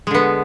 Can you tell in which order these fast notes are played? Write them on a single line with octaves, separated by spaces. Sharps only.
G#3 D3 B3